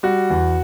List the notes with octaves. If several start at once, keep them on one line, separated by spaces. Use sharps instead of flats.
G3 F#4
E2